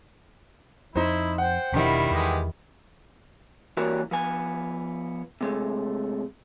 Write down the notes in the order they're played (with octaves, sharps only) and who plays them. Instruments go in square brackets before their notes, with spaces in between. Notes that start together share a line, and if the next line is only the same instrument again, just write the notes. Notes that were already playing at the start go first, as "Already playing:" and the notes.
[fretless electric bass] F2 [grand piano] D#4 C5 [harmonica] E4
[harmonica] C5 G5 [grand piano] F#5
[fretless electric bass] E1 B2 D4 [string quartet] D#3 G3 E4
[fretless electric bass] E2 [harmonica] G#3 G4 B4
[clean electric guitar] E3 G3 A#3 C#4 F#4 A#4
F3 B3 G#5
C3 G#3 A3